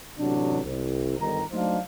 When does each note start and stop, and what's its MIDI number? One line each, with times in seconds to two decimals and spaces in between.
0.17 0.58 33
0.17 0.58 48
0.17 0.58 54
0.17 0.58 62
0.63 1.17 36
1.18 1.43 31
1.18 1.43 51
1.18 1.43 82
1.52 1.77 54
1.52 1.77 57
1.52 1.77 62
1.52 1.77 63
1.52 1.77 72
1.52 1.77 77